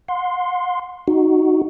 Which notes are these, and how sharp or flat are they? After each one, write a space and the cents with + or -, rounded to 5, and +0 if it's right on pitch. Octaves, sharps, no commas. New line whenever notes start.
F#5 -40 C6 +0
D#4 +0 F#4 +0